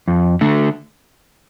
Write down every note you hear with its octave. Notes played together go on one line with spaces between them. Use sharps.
F2
D3 A3